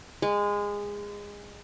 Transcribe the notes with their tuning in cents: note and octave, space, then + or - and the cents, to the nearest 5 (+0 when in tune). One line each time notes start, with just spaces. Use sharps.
G#3 -20